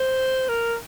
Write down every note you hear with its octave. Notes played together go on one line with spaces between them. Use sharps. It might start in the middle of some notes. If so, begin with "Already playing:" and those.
Already playing: C5
A#4